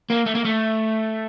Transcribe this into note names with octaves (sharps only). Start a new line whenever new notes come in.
A#3
A3
A#3
A3